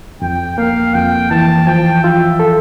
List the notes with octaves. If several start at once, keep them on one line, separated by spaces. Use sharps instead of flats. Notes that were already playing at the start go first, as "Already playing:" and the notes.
F2 G5
A#3 F5
F2 G5
E3 A5
F3 G5
F4 E5
A4